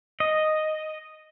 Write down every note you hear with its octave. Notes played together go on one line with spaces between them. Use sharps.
D#5